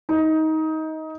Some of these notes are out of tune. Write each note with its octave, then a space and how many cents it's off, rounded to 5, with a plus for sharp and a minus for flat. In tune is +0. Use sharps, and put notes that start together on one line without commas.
D#4 +20